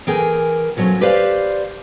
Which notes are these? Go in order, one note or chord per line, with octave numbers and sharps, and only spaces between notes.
E3 G#4 A#4 G5 G#5
F3 F#3 A3 C4 C#4
G4 B4 C5 D5 F5